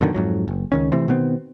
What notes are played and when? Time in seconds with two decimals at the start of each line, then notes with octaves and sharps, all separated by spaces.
0.01 F#2 B2 D3 D#3
0.14 F2 G#2 F#3
0.48 F#1
0.72 C#2 D#3 C#4
0.92 C3 E3 A3 C4
1.08 B2 D#3 B3 C4